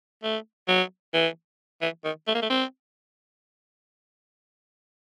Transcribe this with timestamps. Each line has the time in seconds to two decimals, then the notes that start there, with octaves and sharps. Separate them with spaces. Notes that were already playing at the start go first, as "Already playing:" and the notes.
0.24 A3
0.68 F#3
1.14 E3
1.82 E3
2.04 D#3
2.27 A3
2.35 A#3
2.42 A3
2.50 C4